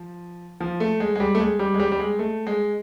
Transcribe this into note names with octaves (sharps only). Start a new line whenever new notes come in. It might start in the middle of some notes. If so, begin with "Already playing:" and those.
Already playing: F3
F3
A3
G#3
G#3
G3
A3
G#3
G3
G#3
G3
G3
G#3
A3
G#3